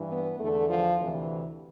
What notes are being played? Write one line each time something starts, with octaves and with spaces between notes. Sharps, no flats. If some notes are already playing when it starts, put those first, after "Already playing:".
Already playing: G2 E3
B3
E2 D3 A3
F3
D2 C3 E3